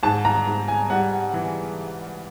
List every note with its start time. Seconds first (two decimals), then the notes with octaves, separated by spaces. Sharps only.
0.03 G#2 A5
0.25 A#5
0.47 G#2
0.68 G#5
0.90 G3 F#5
1.34 E3